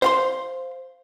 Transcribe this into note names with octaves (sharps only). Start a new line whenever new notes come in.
C5 F5 C6